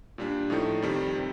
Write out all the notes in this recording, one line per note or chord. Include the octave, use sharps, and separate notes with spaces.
A#2 G3 D4
A2 F3 A3 D#4
F2 D#3 G3
C3